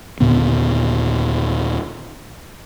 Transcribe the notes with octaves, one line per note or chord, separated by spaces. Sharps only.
D#2 A#2 D3 B3